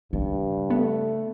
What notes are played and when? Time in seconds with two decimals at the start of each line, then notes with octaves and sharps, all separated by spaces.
0.13 G2 C#3
0.70 A3 B3